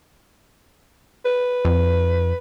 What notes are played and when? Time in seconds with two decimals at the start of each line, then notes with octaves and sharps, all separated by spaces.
1.25 B4
1.65 F2